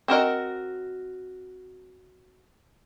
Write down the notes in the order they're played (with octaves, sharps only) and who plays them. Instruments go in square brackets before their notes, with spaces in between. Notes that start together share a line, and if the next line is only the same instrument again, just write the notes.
[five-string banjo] C4 F#4 A#4 D#5